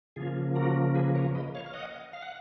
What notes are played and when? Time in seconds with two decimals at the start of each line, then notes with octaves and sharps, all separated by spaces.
0.16 C#3 F3 A#3 F4 G#4
0.55 F#4 A#4
0.95 G#4 B4
1.15 A#4 C#5
1.35 B4 D#5
1.55 C#5 F5
1.66 F5
1.74 D#5 F#5
2.13 F5
2.22 F#5